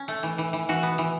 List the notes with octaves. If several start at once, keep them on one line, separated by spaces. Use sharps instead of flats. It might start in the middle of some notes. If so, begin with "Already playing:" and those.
Already playing: C#4
A3
E3
E3
E3
E3 F#4
B3
E3